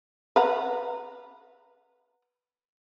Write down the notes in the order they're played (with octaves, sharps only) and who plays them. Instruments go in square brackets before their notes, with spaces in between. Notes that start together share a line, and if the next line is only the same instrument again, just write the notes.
[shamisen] B4 F#5 A#5